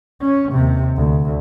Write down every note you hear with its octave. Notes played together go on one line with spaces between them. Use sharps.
C#4
D#2 C3
D2